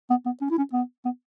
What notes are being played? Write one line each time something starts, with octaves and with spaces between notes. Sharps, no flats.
B3
B3
C#4
E4
C#4
B3
B3